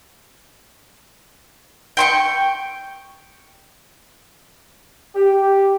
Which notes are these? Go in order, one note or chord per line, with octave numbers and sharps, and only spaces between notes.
G5 C6 C#6
G4